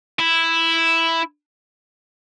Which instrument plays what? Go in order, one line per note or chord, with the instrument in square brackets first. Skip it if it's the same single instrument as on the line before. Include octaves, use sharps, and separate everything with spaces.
[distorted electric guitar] E4